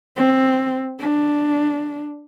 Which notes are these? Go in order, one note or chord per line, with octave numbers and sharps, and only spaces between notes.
C4
D4